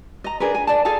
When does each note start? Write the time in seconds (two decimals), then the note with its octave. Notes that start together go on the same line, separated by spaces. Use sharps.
0.24 D#5 A#5
0.40 D4 G#4 A#4 B4
0.55 G#5
0.67 D5 A5
0.85 G#4 A4 F5 A5